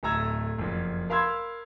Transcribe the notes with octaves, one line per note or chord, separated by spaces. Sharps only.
D1 A3 A4 A#5 E6 G#6
F#1 F2
A#4 F5 B5 C6 E6 G#6